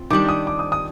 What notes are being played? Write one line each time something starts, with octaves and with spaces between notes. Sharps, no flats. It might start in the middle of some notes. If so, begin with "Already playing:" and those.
Already playing: C4 F4
D#3 G3 D4 D6
D#6
D6
D#6
D#6